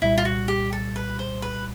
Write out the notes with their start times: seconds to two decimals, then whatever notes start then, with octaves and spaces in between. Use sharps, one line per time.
0.02 C2 A#2 G3 E4
0.18 F4
0.25 F#4
0.48 G4
0.73 A4
0.96 B4
1.19 C5
1.42 B4